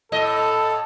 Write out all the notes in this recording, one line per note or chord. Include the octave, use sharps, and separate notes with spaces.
A2 A4 D#5